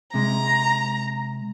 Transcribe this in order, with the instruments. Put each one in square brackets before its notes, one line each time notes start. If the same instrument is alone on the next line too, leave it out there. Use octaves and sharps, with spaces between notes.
[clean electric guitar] C3 G#3 [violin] A#5